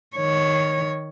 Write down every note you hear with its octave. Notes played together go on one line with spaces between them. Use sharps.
D#3 C#5